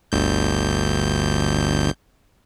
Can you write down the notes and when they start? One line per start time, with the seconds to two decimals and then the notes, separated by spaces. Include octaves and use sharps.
0.12 G1 D2 G6